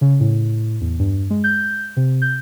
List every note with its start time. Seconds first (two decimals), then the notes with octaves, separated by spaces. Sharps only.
0.01 C#3
0.20 A2
0.81 E2
0.99 G2
1.30 G#3
1.44 G6
1.97 C3
2.22 G6